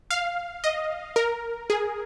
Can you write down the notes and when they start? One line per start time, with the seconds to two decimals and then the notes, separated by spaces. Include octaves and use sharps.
0.11 F5
0.64 D#5
1.16 A#4
1.70 G#4